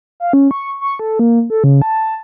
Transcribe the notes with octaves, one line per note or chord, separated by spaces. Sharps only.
F5
C#4
C#6
C#6
A4
A#3
A4
C#3
A5